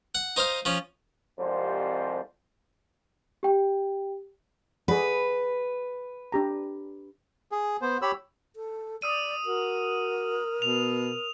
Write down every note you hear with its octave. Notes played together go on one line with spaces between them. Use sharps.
F#5
D#4 C5 D#5 F5
F3 C#4
C2 F2 G#2 G3 C5
G4 G5
G#4 B4 D5 F#5
D4 G4 A#5
G#4
B3 C5
G4 C#5 B5 E6
A4
D5 D#6 E6 D#7
F#4 A#4
B2 F7